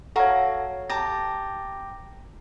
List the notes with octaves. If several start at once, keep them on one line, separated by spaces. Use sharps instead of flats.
F#4 A4 C#5 F5 A#5
G4 A5 A#5 A#6